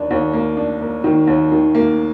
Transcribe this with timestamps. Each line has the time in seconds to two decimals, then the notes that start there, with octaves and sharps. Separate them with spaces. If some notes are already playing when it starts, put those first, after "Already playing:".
Already playing: D#2 D4
0.11 D#2
0.33 A#3
0.57 D4
0.81 A#3
1.04 D#3
1.27 D#2
1.52 D#3
1.75 A#3